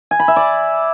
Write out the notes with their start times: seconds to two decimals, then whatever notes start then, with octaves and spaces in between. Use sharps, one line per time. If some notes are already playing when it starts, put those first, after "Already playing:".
0.11 G#5
0.19 B5
0.28 E5
0.36 D5